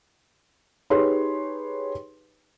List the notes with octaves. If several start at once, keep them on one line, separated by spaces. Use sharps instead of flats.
D#4 G4 G#4 B4 C#5 C6